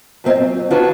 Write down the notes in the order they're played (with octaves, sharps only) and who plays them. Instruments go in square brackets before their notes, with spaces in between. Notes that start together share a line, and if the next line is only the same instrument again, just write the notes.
[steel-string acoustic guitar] E2 A#2 C4 D#5 E5
F#2
D#3 D4 F4 F#4 B4 C#5